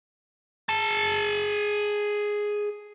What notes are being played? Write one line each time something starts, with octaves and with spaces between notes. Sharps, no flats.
G#4 A5